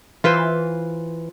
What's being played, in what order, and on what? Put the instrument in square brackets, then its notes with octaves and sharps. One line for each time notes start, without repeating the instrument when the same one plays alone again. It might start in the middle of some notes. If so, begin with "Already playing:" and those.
[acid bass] E3 [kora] F4 B4 C5